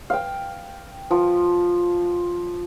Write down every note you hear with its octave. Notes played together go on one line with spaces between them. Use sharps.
F5 G5
F3